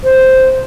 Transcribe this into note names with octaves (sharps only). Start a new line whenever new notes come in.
C5